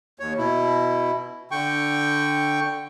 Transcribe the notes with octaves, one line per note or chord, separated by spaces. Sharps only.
D#2 C#5
B2 E4
D3 G5 C#6